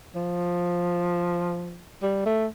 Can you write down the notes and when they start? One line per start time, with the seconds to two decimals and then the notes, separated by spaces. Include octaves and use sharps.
0.15 F3
2.02 G3
2.26 A3